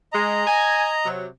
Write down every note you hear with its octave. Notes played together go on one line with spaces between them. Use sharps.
G#3 D#5 A#5
G#5
C3 F#3